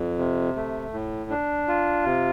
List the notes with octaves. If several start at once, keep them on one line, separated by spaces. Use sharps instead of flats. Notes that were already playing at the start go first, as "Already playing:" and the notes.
Already playing: F2
C3
A3
A2
D4
F4
C3